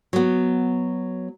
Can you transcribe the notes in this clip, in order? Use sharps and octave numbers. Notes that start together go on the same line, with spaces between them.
F#3 B3